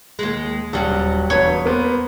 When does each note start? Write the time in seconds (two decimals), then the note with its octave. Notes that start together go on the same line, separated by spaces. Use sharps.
0.19 D#2 G#3
0.73 D#1 F#3 G3
1.30 E1 B4 C#5
1.66 A#3 B3 C5